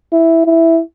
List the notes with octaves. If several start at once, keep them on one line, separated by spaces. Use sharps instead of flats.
E4
E4